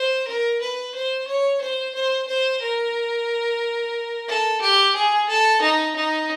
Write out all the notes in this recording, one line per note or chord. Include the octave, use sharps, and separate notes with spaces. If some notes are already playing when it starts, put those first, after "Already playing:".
Already playing: C5
A#4
B4
C5
C#5
C5
C5
C5
A#4
A4
G4
G#4
A4
D#4
D#4